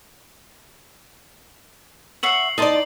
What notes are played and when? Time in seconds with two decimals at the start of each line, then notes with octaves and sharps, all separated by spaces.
2.23 C#5 E5 F#5 C7 F#7
2.58 D#4 D5 D#5 A5 C6